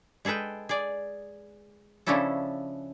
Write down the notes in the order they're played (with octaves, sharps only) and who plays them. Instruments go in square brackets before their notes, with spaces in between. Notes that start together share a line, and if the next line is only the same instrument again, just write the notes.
[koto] G#3 G#4 A4 B4 G5
G#4 D5
C#3 F3 C#4 D4 E4 A4